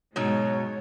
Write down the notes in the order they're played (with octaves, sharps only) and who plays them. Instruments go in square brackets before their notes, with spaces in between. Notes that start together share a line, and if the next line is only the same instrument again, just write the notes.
[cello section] G#2 G#3 [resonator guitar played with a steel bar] B2 F#3 D#4 [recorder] C#5